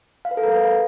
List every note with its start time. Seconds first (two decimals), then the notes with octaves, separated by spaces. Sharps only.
0.25 F5
0.31 B4
0.37 A4
0.43 A#4
0.50 B4